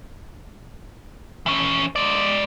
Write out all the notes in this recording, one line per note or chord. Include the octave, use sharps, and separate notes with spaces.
E3 C#4
G#3 D5